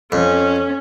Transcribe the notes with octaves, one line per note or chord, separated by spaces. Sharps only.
F2 C#4